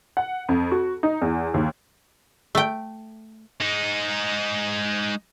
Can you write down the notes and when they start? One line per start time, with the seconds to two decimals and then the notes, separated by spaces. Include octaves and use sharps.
0.17 F#5
0.49 F2
0.72 F#4
1.03 D#4
1.22 E2
1.54 D#2
2.55 A3 G5
3.61 G#3 D#4